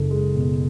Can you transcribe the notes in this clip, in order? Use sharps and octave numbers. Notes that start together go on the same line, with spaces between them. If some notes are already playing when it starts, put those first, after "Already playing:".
Already playing: F#1 G#3 A4
G#3
B2